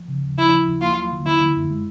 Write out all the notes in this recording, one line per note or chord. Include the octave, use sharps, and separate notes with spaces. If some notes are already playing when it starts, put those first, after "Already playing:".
Already playing: F3
C#3
D#2
F3 E4
F3
D#2
A#3 F4
F#3
D3
D3 E4
D3
F#2
G#3